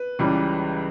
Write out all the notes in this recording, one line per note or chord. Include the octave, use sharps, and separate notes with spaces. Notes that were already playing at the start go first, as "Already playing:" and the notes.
Already playing: B4
C#2 C#3 E3 G3